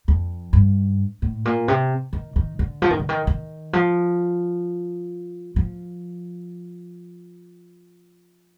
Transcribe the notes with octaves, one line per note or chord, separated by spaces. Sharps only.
F2
G2
A2
A#2
C3
D#3
D#3
D3
F3
D#3
D3
D#3
D#3
F3
F3